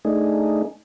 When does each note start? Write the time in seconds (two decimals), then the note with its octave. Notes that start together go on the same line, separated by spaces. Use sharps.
0.05 A3 D4 D#4 G#4